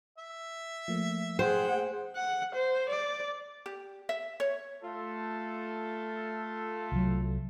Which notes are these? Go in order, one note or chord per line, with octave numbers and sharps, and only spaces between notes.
E5
F3 A3 A#3
G#4 C5 F#5 G5
F#5
C5
D5
G4
E5
C#5
A3 F4 A4
C2 F#3